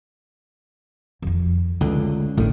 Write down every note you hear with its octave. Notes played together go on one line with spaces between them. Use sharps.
F2 F3
C#2 D3 A3
G#1 A2 D3 D#3